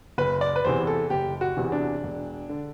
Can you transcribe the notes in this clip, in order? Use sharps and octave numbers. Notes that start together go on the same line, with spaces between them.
F#1 B4
D5
B4
E2 C3 E3 C5
A4
F#1 G4
F#4
E2 C3 E3
D4
E1
D3